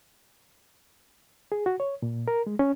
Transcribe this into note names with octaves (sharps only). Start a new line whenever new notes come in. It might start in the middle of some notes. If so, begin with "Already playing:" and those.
G#4
F#4
C#5
A#2
A#4
G#3
C#4